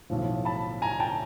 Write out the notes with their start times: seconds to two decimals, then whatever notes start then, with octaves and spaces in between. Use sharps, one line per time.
0.10 B1 A2 F3
0.45 A5 B5
0.82 G#5 A#5
1.00 G5 A5